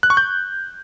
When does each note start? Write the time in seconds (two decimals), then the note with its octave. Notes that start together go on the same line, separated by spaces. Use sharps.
0.03 F#6
0.10 C#6
0.17 G6